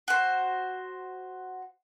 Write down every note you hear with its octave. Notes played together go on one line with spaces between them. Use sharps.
F#4 C5